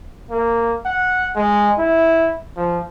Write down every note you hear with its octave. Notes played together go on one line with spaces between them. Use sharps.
A#3
F#5
G#3
E4
F3